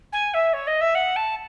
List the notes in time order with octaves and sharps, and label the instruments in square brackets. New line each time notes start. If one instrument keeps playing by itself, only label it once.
[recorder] G#5
E5
C#5
D#5
E5
F#5
A5